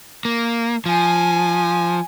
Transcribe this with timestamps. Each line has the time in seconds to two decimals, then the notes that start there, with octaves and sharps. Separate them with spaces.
0.25 A#3
0.86 F3 G#5